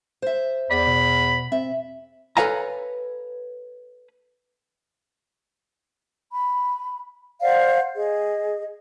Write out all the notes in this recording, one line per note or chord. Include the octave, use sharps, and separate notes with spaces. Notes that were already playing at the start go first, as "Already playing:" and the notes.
C5 E5
E2 D5 B5
B2
C4 E5
A4 B4 C#5 F5 G#5 A#5
B5
C5 D5 F5 F#5
G#4 D#5